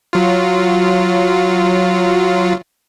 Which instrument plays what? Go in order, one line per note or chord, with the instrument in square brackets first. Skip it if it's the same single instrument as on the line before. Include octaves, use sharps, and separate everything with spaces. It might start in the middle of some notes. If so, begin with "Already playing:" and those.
[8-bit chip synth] F#3 F4